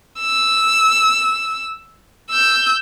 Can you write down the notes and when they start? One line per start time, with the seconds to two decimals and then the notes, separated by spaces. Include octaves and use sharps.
0.20 E6
2.30 E6 G6